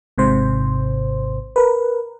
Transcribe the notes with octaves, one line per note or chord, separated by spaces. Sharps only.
G#1 G#2 C3 C5
A#4 B4